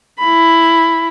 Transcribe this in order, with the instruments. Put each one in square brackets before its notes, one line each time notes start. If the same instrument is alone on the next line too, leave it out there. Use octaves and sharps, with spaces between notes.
[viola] E4 B5